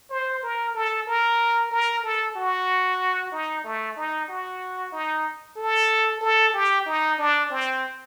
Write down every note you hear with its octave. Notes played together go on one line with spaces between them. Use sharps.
C5
A#4
A4
A#4
A#4
A4
F#4
D#4
A3
D#4
F#4
D#4
A4
A4
G4
D#4
D4
C4